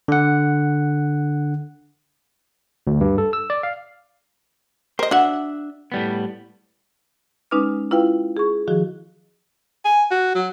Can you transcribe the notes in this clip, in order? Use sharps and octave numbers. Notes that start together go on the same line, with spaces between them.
D3 F#5
D2
G2
A4
E6
D5
F5
A#4 C5 D#5
D4 F#4 E5 F#5
A2 G3 B3
G#3 C#4 D#4 B4 D6 F6
E4 F4 B4 F5 G5
G#4 C#6
D#3 F3 F#4 G#4
G#5
F#4
F#3